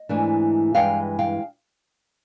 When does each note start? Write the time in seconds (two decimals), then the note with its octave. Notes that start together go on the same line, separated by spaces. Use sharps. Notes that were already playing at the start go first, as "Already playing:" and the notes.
Already playing: D#5
0.09 G#2 E3 A3 D4
0.74 G2 E3 G#3 F5 G5
1.19 F5 G5